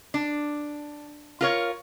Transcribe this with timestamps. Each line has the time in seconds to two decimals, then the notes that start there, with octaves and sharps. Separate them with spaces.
0.14 D4
1.41 F4 A#4 C#5